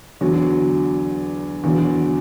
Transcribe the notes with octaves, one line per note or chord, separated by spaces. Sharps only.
E2 D3 F#3
E2 D3 F#3